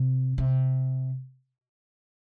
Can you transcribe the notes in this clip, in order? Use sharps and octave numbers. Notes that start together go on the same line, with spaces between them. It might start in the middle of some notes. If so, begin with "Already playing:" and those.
Already playing: C3
C3